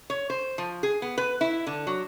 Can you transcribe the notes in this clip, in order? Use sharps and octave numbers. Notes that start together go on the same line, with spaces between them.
C#5
C5
F3
G#4
B3
B4
E4
D3
F#3